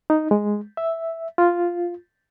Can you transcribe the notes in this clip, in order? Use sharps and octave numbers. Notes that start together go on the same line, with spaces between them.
D#4
G#3
E5
F4